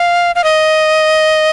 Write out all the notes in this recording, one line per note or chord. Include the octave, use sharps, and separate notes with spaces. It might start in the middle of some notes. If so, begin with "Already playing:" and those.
Already playing: F5
F5
D#5